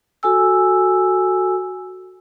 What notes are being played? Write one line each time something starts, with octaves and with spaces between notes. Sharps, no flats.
F#4 A4 G#5 E6